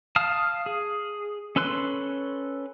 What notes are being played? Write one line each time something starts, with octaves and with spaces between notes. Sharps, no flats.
F5 A5 D#6 F6
G#4
C#4 A4 B4 C6 F#6